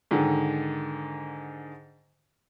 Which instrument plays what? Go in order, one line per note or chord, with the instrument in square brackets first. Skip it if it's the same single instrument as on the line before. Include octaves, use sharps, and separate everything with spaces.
[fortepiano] G#2 D3 D#3